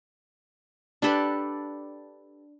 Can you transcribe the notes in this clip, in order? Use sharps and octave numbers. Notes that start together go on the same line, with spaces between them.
D4 G4 A4 B4